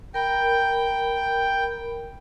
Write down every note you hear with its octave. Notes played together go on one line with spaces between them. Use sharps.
A#4 G5 A#5 B5